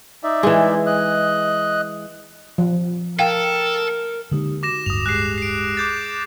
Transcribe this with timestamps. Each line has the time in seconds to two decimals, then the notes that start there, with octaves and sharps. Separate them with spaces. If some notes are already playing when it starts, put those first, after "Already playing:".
0.24 D#4 D5 E5
0.43 E3 G#3
0.86 D#5 F#6
2.58 F3
3.19 A4 A#4 F5 G5
4.31 D3 G#3 A#3 D#4 G4
4.63 F#4 D6 A#6 E7
4.86 D1 G#1 G2 D#6 F7
5.06 G#3 G4 G#4 F#6 C7
5.38 C7 D7
5.77 G#4 D6 G6 A6